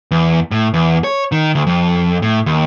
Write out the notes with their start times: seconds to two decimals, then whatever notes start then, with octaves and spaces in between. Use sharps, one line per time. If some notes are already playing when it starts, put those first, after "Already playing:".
0.11 E2
0.51 A2
0.74 E2
1.04 C#5
1.32 D#3
1.55 D2
1.67 F2
2.22 A2
2.46 D#2